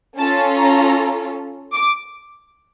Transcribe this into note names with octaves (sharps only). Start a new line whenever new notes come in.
C#4 F4 A4 A5
A#5
D6